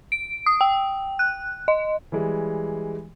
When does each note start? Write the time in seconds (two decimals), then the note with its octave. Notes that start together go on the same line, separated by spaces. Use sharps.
0.12 D7
0.46 D#6
0.61 G5
1.19 F#6
1.68 D#5
2.12 E3 G3 G#3